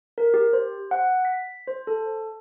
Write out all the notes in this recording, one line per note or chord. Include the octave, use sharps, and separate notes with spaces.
A#4
G4
C5
F#5
B6
C5
A4